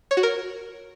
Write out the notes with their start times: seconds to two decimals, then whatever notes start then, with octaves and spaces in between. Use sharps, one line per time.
0.11 C#5
0.17 F#4
0.23 A#4